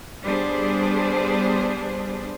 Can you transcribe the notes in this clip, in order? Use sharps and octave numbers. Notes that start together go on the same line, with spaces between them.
G3 B3 D4 G#4 C5